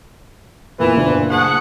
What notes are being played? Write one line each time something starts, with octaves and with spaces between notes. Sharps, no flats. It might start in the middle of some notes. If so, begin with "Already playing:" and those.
E2 A#2 E3 B3
F#1 A#2 D4
A3 G#4 F#5